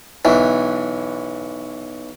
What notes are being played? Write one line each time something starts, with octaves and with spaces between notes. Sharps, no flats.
B1 E3